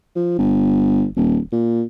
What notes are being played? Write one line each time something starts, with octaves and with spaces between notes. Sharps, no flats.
F3
G1
D#1
A#2